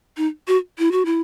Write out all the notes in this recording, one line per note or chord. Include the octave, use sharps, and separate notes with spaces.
D#4
F#4
E4
F#4
E4